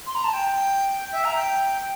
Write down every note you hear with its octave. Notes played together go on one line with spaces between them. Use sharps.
C6
A#5
A5
G5
E5
A#5
G5